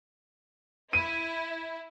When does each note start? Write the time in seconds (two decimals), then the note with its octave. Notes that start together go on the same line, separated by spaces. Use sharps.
0.93 E4 D#7